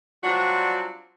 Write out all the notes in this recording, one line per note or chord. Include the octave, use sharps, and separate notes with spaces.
F#3 G3 C4 D4 F4 F#4